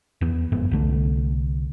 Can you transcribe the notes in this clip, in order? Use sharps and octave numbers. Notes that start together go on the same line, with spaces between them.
E2 B3
F#1 F2 G#2 B3
C2 D3 A3